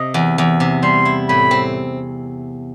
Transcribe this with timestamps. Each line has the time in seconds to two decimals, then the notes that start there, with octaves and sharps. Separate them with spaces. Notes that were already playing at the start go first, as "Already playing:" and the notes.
Already playing: C3 D#5
0.14 E2
0.38 E2
0.60 C3
0.83 G3 C6
1.05 E4
1.29 A2 B5
1.51 C4